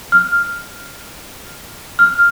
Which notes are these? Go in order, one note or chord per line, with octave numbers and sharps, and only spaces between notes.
F6
F6